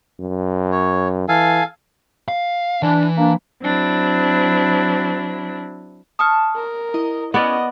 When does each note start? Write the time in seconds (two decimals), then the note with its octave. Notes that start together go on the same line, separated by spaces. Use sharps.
0.20 F#2
0.72 C#5
1.28 E3 A4 F5 G#5
2.28 F5
2.83 E3 D4
3.18 A#3 D4
3.62 F#3 C4 D4 E4
6.19 A5 C#6 D#6 F6
6.56 A#4
6.94 E4 D#5
7.34 B3 C#4 D5 D#5